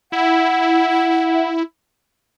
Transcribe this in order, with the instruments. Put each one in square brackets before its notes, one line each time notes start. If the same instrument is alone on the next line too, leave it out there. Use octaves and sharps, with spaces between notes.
[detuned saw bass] E4 [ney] F#5